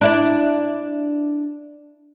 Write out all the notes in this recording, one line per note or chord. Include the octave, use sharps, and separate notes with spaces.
D4 E4 D5